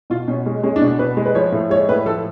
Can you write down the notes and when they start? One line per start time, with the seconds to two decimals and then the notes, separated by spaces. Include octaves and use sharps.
0.10 B2 F4
0.28 B2 C#4
0.46 G#3
0.63 G#3 C#4
0.76 D4
0.82 B2
0.87 D4
0.99 B2 B4
1.17 G#3
1.26 B4
1.35 F3 C#5
1.52 A2
1.70 G#3 C#5
1.89 A2 B4
2.06 F3 A4